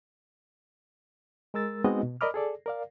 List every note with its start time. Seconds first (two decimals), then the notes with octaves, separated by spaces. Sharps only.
1.54 G#3 A#4 E6 A6
1.84 G#3 B3 C4 D#4 F#4 D#5
2.03 B2
2.21 A#4 D5 D#5 B5 D6 F6
2.34 G#4 A4 D5
2.66 A#4 D5 F5